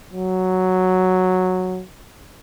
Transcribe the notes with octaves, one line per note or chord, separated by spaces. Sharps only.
F#3